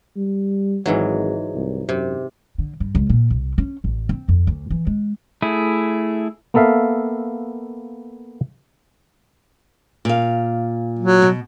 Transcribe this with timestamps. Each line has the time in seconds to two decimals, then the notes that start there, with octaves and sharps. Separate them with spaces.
0.16 G3
0.86 G#1 G#2 E3 F#3
1.55 C2
1.89 F#2 C3
2.58 D3
2.80 G2
2.95 C#2
3.09 A#2
3.30 C2
3.58 C#4
3.84 A1
4.09 C4
4.28 F2
4.47 D2
4.70 E3
4.87 G#3
5.42 A3 E4 G#4
6.54 A#3 B3 A4 E5 F5
10.05 A#2 F5
10.99 F#3
11.22 B2